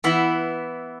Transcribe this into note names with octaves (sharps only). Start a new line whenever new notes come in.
E3 B3 E4